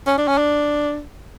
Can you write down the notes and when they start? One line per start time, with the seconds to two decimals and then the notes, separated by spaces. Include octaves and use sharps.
0.07 C#4
0.18 D4
0.28 C#4
0.38 D4